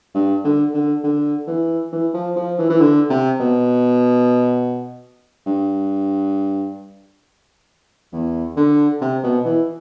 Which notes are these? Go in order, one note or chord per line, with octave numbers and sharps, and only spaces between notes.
G2
D3
D3
D3
E3
E3
F3
F3
E3
E3
D3
C3
B2
G2
E2
D3
C3
B2
E3